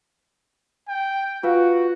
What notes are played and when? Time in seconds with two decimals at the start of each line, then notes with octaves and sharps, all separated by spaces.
0.88 G5
1.43 F4 F#4 B4 F5